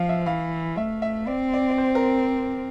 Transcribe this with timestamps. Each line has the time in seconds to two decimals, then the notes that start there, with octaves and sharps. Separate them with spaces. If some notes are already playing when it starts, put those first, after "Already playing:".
Already playing: F3 F5
0.09 E5
0.26 E3 F5
0.76 A3 E5
1.02 E5
1.27 C4 D5
1.54 D5
1.70 D5
1.78 C5
1.95 A#4